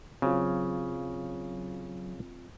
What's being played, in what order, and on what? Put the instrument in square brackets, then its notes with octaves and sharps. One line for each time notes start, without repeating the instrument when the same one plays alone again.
[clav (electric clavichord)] C#3 [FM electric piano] F#3 [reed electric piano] C4 F4